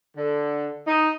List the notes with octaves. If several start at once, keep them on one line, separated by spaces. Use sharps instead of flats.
D3
D#4